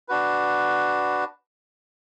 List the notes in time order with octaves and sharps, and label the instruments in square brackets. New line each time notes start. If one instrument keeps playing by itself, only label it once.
[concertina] D4 F#4 B4